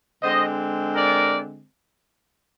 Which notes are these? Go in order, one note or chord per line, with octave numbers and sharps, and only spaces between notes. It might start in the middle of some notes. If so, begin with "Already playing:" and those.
D3 G#3 C4 C5 D#5
A#4 D5